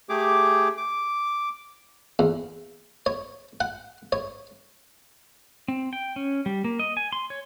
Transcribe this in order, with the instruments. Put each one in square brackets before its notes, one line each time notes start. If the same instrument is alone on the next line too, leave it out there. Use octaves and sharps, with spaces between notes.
[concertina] A3 G4 G#4 D6
D6
[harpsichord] E2
C#5
F#5
C#5
[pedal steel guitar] C4
G5
C#4
G3
A#3
D#5
G#5
C6
C#5